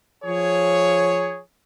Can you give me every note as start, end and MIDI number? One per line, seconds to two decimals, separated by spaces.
0.24 1.40 53
0.24 1.40 68
0.24 1.40 73